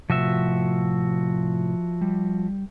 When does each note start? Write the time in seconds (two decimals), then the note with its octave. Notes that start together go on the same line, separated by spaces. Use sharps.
0.10 A2 C3 F3 F#4 E5
2.01 G3